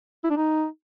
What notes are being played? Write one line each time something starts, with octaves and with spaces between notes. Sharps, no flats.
E4
D4
D#4